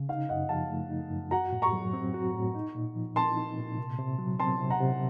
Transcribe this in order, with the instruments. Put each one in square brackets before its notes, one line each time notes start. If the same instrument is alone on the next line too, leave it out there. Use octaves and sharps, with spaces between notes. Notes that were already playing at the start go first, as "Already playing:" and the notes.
Already playing: [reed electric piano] C#3
[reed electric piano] D#4 [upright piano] F5
[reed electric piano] F#2 [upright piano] D#5 F#5
[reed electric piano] F3 [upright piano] F5 A5
[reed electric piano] A3
D#4
F#2
[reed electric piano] F#4 [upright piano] F#5 A#5
[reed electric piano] A2
[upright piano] A#5 C#6
[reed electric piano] F#3
C4
F#4
A2
D#4
A#2
F3
[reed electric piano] C4 [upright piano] A5 C6
[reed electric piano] D#4
A#2
C3
C3
F#3
[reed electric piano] C4 [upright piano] A5 C6
[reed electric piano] C3
[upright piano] F#5 A#5
[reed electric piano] C3